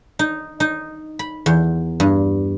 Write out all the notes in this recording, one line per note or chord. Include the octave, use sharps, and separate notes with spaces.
D#4
D#4
B5
E2
G2